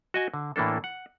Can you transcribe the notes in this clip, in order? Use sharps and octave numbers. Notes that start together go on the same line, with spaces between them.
F#4 D#5 G#5
D3
A2 E3 A#3 D4 A4
F#5